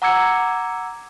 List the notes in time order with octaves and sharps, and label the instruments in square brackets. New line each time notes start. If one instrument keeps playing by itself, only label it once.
[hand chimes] F#5 A#5 D6 E6 G#6 C#7